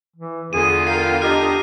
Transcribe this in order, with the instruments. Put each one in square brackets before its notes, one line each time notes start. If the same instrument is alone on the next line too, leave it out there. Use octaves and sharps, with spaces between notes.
[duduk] E3
[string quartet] E2 D3 F4 [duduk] G#4 [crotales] D#7
[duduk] A#4 [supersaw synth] F5 G5 [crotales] C7
[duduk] D4 [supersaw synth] G4 D#5 A#5 [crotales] F6